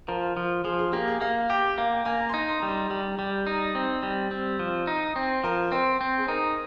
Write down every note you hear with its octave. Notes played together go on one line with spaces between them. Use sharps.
F3 A#4
F3
F3 G#4
G#4
A#3 G4
G#4
A#3 F5
G4 G5
A#3 F5
G5
A#3 G#5
A#5
C6
D#4
A#5
C6
G3 A#5
C6
A#5
G3 A#5
G3
D#4 A#5
C4
G3
C4
F3
D#4
C4
F3 A#4
C4 C5
C4
G#4
D#4 A#4